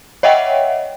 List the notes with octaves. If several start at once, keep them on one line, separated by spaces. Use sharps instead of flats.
C#5 D#5 E5 F#5 G5